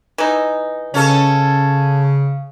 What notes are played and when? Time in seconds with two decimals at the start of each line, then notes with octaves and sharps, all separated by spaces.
0.18 E3 D#4
0.94 C#3 C#4 A4